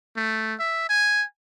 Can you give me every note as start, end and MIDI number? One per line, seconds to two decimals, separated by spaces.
0.17 0.54 57
0.60 0.87 76
0.89 1.24 80